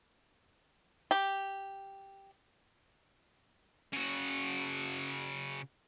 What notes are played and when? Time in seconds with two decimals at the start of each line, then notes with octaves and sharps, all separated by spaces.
1.11 G4
3.93 C#3 F#4